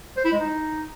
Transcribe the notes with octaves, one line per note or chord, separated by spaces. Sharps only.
C5
E4
G#3
D#4